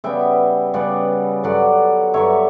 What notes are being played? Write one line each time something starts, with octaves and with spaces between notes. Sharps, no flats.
C#3 G3 B3 E5 G5
C#3 G3 B3 D5 F#5
G2 D3 F#3 D5 F#5
G2 D3 F#3 C#5 E5